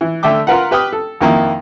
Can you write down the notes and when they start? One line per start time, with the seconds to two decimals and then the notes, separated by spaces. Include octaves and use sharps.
0.01 E3
0.23 D3 A3 E5 G5 D6
0.47 F4 A#4 B4 F#5
0.71 G4 B4 G5 D#6 F6
0.93 A4
1.21 F2 D#3 A#3 E4